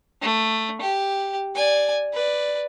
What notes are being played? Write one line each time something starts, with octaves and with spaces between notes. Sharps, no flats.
A3
G4
D5 G#5
B4 D5